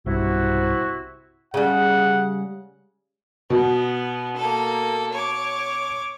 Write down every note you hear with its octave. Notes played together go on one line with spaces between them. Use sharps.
B1 G2 C3 E4 F#4
C#3 G3 F#5
B2 B3
A#3 A4
C#5 D6